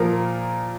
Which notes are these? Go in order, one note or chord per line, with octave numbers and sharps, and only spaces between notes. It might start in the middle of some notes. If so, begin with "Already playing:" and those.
Already playing: A#2 F3 A#4